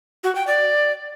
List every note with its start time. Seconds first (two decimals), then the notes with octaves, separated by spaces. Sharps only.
0.24 F#4
0.36 G5
0.47 D5